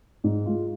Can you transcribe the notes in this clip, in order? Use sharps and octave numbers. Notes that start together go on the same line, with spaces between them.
G#2
G#3 F4